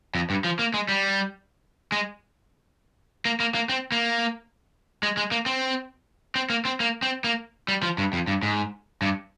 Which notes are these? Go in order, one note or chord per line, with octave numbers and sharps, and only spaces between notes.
F2
G2
F3
A#3
G#3
G3
G#3
A#3
A#3
A#3
C4
A#3
G#3
G#3
A#3
C4
C4
A#3
C4
A#3
C4
A#3
G3
F3
G2
F2
G2
G#2
G2